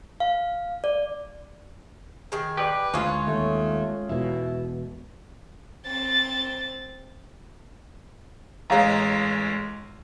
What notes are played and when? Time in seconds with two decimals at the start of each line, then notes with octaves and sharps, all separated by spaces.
0.20 F5
0.84 D5
2.32 D#3 G#4
2.57 G4 B4 D5
2.94 D2 G#3 C#4 F4 G#4 C#5
3.27 D#2 A3
4.09 E1 B2 E4
5.87 C4 A6
8.70 A1 G#3 C#5 F5 A#5